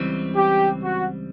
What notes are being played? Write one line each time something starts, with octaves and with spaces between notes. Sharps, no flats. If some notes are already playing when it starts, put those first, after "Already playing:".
Already playing: C#2 C#3 E3 G3 C4
G4
F#4